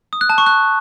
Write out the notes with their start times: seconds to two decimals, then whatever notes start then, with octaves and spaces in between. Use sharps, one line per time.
0.13 D#6
0.21 F#6
0.30 A5
0.38 C#6
0.46 F#6